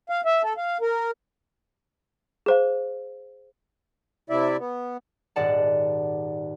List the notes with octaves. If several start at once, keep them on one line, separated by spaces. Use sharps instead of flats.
F5
E5
A4
F5
A#4
G#4 C5 F5
C3 E4 D5 E5
B3
D#1 G#2 D5 F#5 A5